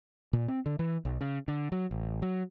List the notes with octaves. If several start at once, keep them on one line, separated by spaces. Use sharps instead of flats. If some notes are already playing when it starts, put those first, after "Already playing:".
A#2
C4
D3
E3
B1
C#3
D3
F#3
A1
F#3